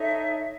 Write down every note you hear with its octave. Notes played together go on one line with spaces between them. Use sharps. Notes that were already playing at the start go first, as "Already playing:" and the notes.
Already playing: D#4 A4 C#5 E5